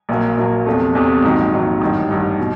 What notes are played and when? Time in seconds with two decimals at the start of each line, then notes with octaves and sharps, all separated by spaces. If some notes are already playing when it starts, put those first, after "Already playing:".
0.09 A#1 A#2 F#3 A#3
0.37 A#1 A#2 F#3 A#3
0.66 E2 C3 F3 A3
0.95 E2 C3 F3 A3
1.23 A#1 G#2 D#3 F#3
1.52 A#1 G#2 D#3 F#3
1.81 A1 G2 D#3
2.10 A1 G2 D#3
2.39 B2